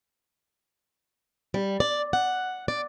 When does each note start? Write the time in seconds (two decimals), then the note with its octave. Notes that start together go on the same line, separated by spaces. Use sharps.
1.54 G3
1.80 D5
2.13 F#5
2.68 D5